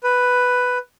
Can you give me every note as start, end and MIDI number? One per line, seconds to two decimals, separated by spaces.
0.04 0.78 71